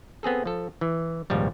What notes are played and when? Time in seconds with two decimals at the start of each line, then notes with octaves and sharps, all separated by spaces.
0.23 B3 C4 G#4 A4
0.46 F3 A4
0.81 E3
1.30 G#1 C#2 A#2 F3 G3